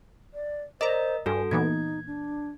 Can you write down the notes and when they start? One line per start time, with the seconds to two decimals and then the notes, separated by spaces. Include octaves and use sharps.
0.34 D5
0.81 A#4 C5 D5 D#5 A#5
1.26 G2 F#4 A4 G#5
1.51 A#2 E3 B3 D#4 G#6
2.07 D4